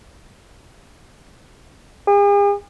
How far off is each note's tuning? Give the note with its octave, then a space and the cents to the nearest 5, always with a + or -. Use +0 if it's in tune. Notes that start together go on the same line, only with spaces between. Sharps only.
G#4 -45